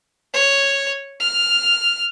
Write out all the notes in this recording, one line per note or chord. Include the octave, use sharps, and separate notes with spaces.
C#5
F6